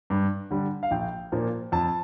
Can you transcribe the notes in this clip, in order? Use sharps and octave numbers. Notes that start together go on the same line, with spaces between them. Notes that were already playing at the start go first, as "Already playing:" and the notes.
G2
D3 G3
F5
A#1 G5
A#2 F3 A#3
F2 A5